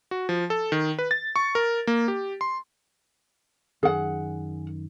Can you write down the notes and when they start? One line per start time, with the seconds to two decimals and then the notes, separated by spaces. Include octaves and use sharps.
0.11 F#4
0.29 F3
0.50 A4
0.72 D#3
0.99 B4
1.11 A6
1.36 C#6
1.55 A#4
1.87 A#3
2.08 G4
2.41 C6
3.83 F#2 D#3 G#4 F#5